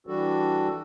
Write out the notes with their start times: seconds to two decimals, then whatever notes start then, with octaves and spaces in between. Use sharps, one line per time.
0.07 E3 G3 D4 F#4 A4